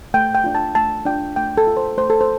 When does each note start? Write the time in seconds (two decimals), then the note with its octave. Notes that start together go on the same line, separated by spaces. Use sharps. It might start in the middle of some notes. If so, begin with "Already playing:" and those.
0.14 A3 G5
0.35 G5
0.44 D4 F4
0.55 A5
0.75 A3 A5
1.06 D4 F4 G5
1.36 A3 G5
1.57 A4
1.67 F4
1.77 C5
1.97 A3 C5
2.10 A4
2.21 C5